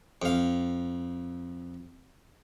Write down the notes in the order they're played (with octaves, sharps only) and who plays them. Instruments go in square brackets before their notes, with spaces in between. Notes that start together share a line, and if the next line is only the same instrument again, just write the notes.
[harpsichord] F2 F5